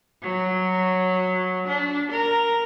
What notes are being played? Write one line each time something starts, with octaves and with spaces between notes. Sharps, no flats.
F#3
D4
A#4